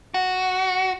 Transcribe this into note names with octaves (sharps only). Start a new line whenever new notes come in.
F#4